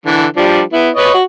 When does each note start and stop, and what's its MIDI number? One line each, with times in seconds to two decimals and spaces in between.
0.06 0.25 50
0.06 0.25 52
0.37 0.62 53
0.37 0.62 55
0.37 0.62 62
0.73 0.89 59
0.73 0.89 64
0.96 1.13 71
0.96 1.13 73
0.96 1.13 75
1.14 1.23 66